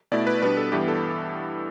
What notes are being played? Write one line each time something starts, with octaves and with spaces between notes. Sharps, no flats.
B2 A3 E4 D5
B4
B2 G3 B3 D4 B4
A4
G2 E3 G3 B3 E4 G4
A4